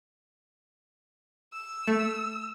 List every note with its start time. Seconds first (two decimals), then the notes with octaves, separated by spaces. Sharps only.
1.53 E6
1.87 A3